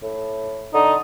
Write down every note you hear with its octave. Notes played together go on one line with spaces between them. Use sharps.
A2
D3 D#4